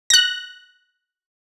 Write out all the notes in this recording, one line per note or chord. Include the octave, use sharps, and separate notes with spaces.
F#6 A#6